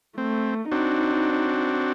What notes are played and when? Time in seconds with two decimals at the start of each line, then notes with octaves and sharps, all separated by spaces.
0.18 A3 C4
0.72 C4 D4 D#4 F#4